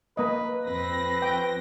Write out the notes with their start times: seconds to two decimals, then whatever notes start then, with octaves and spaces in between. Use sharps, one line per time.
0.17 A#3 B4 D#5
0.66 F2 C4 B4 A#6
1.22 G5